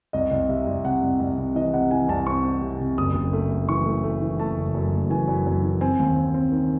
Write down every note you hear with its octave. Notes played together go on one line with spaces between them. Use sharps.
C2 D#5
C2
C3 E5
C2
C3 F#5
C2
C2
C3
E3 D#5
C3 F#5
E3 G#5
C2 A5
C4 C#6
C4
C3
C3
F#1 D#6
F#1
A3
A3
E3 C#6
A3
A3
E3
A3 A5
F#1
F#2
F#1
E3 G#5
F#2
F#2
E3
C4 G#5
D#2
C4
C4
D#3